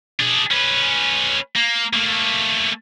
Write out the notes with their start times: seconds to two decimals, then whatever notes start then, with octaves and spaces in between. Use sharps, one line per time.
0.20 D4 G#4
0.51 C#4 B4
1.56 A#3
1.94 A3 A#3